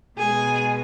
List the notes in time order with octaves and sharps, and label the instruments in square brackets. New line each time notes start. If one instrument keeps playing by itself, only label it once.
[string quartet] B2 G#3 G#4